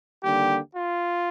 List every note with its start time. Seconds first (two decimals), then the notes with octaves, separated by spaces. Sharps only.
0.23 D#2 D3 G3 A#3 G4
0.74 F4